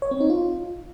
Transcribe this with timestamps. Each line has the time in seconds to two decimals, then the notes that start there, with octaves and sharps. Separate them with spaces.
0.02 C#5
0.11 C4
0.20 D#4
0.30 F4